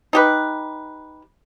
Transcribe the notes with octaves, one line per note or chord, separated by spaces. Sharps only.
D#4 G4 B4